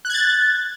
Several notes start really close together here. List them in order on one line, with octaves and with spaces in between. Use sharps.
F#6 G#6 A6